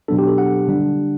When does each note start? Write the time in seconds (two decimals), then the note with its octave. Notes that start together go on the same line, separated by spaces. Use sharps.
0.08 B2 F#3 B3 D4 A4
0.18 G4
0.28 A4
0.38 F#5
0.68 D3 G3 D4